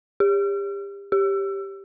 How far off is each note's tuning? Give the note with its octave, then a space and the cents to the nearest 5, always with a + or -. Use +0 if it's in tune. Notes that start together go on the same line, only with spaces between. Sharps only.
G4 +35
G4 +5